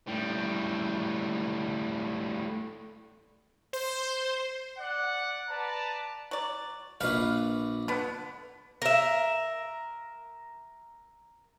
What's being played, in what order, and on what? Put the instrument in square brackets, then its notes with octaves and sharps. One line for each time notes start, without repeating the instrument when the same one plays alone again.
[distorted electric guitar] A2 G3
[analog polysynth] C5
[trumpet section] D5 F#5
B4 D5 A5 A#5
[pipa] F#3 D5
[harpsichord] A#1 B4 [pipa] F5
[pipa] D3 B3
[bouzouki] A#4 E5